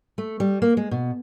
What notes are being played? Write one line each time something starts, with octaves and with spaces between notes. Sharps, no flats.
A3
G3
A#3
G#3
B2